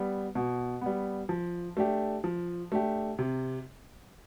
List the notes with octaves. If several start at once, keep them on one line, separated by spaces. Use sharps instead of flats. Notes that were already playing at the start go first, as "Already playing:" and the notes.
Already playing: G3 B3
B2
G3 B3
F3
A3 D4 G4
F3
A3 D4 G4
C3